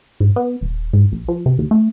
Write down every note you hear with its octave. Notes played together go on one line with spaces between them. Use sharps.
G#2
B3
D#1
G#2
A#1
F3
C3
D#2
A3